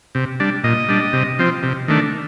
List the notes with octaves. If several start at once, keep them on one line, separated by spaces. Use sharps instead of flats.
C3
G3 D4
A#2 D#5
G3 D4
C3
F3 C4
C3
D#3 A3 D4